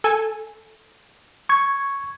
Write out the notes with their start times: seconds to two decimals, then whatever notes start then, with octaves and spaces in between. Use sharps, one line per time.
0.04 A4 G#5
1.49 C#6 G#6